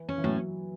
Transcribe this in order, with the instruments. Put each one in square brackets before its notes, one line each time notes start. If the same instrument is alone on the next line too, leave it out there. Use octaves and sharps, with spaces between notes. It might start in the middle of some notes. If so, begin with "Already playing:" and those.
Already playing: [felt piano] E3
[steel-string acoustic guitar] C#4
[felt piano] E3
[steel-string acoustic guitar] A2 [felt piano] F#3